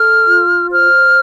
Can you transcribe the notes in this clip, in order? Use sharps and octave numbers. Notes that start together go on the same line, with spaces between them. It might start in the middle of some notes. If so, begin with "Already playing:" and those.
Already playing: A4 F6
F4
C5 F6